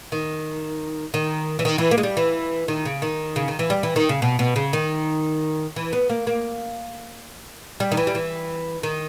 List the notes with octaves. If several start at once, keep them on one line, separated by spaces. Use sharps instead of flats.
D#3
D#3
E3
D#3
E3
A#3
G#3
G3
E3
D#3
C#3
D#3
C#3
D#3
E3
G3
E3
D#3
C#3
B2
B2
C#3
D#3
E3
B3
A#3
A#3
G3
D#3
E3
G3
E3
D#3